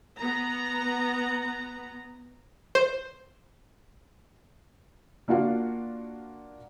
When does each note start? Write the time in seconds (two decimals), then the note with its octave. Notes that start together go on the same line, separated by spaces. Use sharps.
0.16 B3 A#5
2.75 C5
5.28 A#3 D4 F4 F#4 F5